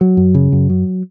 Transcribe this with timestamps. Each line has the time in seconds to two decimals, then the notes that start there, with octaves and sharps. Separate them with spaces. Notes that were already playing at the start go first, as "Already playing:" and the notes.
0.01 F#3
0.17 F#2
0.35 C#3
0.52 F#2
0.70 F#3